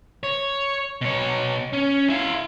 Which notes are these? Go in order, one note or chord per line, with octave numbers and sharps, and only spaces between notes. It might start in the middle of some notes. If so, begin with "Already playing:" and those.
C#5
B2 C#5
C#4
E4 F5